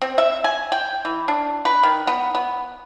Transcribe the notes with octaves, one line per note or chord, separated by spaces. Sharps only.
C4
E5
G#5
G5
E3
D4
B4
D#3
B3
B3